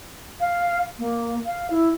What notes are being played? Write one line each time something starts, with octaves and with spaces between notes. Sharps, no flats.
F5
A#3
F5
E4